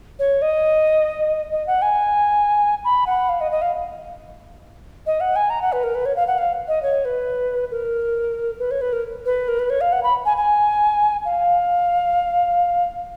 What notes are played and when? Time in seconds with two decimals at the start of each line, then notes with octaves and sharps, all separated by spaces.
0.19 C#5
0.42 D#5
1.52 D#5
1.67 F#5
1.82 G#5
2.84 B5
3.07 F#5
3.29 F5
3.41 D#5
3.52 D#5
3.62 F5
5.06 D#5
5.20 F#5
5.36 G#5
5.50 A#5
5.62 F#5
5.72 B4
5.83 A#4
5.95 B4
6.06 C#5
6.16 F5
6.27 F#5
6.38 F5
6.68 D#5
6.83 C#5
7.05 B4
7.71 A#4
8.59 B4
8.71 C#5
8.81 B4
8.93 A#4
9.26 B4
9.48 A#4
9.59 B4
9.70 C#5
9.81 F5
9.92 F#5
10.03 B5
10.25 G#5
10.37 G#5
11.25 F5